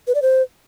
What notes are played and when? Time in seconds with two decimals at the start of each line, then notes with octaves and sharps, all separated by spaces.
0.07 B4
0.15 D5
0.22 C5